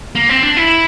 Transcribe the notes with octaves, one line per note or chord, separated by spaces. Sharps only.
A#3
C4
D4
E4